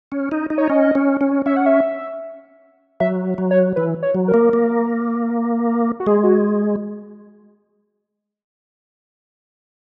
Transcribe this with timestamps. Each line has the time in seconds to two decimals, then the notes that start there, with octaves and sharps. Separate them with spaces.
0.12 C#4
0.32 D#4
0.50 D#4
0.58 C#5
0.69 C#4 D#5
0.95 C#4
1.21 C#4
1.46 C#4 E5
1.56 F#5
1.66 E5
3.00 F#3 E5
3.38 F#3
3.51 C#5
3.76 E3 B4
4.03 C#5
4.15 F#3
4.28 A#4
4.34 A#3
4.53 A#3
6.00 F#4
6.07 G#3 G#4
6.24 F#4